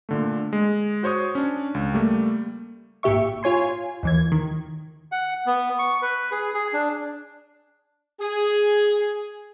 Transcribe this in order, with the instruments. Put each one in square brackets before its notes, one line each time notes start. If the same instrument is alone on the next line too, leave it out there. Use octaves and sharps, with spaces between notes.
[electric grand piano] A#2 D3 A3
G#3
F#4 C5 C#5 C#6 D#6
C#4 D4
C#2
G3 A3 A#3
[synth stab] G#1 A#2 G4 E5 C#6
F4 C#5 G#5 C6
D#2 E3 G#6
D#3
[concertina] F#5
B3
C#6
B4
G#4
G#4
D4
[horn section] G#4